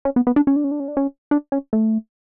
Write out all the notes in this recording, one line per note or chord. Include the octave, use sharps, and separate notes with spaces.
C#4
B3
B3
D4
C#4
D4
C#4
D4
C#4
D4
C#4
D4
C#4
A3